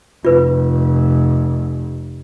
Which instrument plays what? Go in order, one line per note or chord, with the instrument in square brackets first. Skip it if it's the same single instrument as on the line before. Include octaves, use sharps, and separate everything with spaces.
[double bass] F1 [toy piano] F4 B4